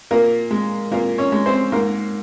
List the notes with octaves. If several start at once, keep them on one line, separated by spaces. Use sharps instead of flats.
A#2 A#3 A#4
G#3
A#2 A#3 A#4
C#4 C#5
G#3
C4 C5
G#2 A#3 A#4